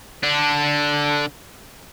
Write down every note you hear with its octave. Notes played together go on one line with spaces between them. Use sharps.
D3 D4